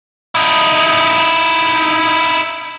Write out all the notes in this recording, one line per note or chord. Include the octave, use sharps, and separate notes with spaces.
D#4 E4